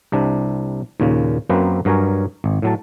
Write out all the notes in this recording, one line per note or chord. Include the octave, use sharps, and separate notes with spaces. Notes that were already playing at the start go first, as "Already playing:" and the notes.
C2 C3 D4
D#2 A#2 C#3
F#2 F#3 A#3 C4 B4 C5
G2 F#3 A#4 C#5 G#5
G#1
A2 F#3 A5